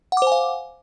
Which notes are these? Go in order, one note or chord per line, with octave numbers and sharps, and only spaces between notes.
C5 F5 F#5 G#5 D6